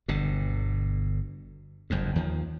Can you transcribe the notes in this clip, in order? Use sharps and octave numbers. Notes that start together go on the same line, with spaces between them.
G1 B2 D3
F#1 F2 G#2
D#2 D#3 F3